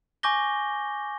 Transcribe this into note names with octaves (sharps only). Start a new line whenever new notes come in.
G#5 C#6 D6 G6 A#6 G7